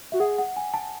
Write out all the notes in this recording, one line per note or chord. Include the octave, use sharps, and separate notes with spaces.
F#4 E5
G#4 F#5
F#5
G#5
A5